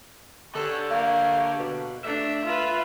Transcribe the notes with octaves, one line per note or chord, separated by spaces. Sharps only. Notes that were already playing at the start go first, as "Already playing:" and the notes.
D3 G4 A4 C#5
A#3
B2
A3 D4 E5
F4 B4